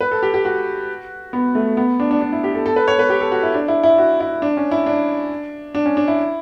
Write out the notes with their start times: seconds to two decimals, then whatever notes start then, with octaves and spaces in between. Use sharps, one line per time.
0.01 B4
0.11 A4
0.23 G4
0.34 G4
0.45 F#4
1.33 B3
1.55 A3
1.77 B3
2.00 D4
2.11 D4
2.21 D4
2.33 E4
2.44 G4
2.55 A4
2.66 A4
2.76 B4
2.88 C#5
2.99 B4
3.10 G4
3.21 A4
3.32 F#4
3.43 E4
3.54 D4
3.68 E4
3.84 E4
3.98 F#4
4.20 E4
4.42 D4
4.57 C#4
4.71 E4
4.86 D4
5.75 D4
5.86 C#4
5.97 D4
6.08 E4